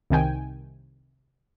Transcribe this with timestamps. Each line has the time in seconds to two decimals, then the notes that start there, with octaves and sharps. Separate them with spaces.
0.10 C2 C3 D#3 G5 G#5